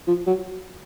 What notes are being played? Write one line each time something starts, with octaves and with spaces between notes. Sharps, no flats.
F3
F#3